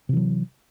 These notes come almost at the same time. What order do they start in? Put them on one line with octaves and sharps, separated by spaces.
C3 E3 F#3